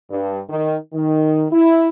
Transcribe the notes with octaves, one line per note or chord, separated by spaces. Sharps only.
G2
D#3
D#3
E4